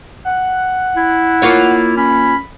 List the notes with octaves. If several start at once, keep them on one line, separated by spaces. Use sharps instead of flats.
F#5
E4
A#3 F4 C#5
C#4 B5